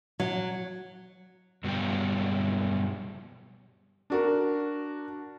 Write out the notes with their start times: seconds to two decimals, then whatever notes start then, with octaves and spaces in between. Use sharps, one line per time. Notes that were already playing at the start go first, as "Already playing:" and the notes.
0.20 F#3
1.64 G2 B2 F#3 G3 F5 G5
4.10 D4 F#4 A#4